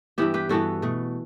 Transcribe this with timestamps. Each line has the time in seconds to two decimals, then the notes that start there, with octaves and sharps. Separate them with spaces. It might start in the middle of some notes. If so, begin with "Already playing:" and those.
0.18 G2 E3 B3 E4 G4
0.34 G4 B4
0.49 G2 E3 B3 F#4 A4
0.82 B2 A3